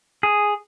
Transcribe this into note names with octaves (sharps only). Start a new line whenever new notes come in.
G#4